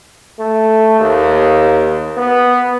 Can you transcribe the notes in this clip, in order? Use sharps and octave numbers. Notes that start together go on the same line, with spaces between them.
A3
D#2
B3